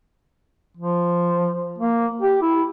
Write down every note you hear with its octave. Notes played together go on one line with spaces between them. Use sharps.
F3
A#3
G4
E4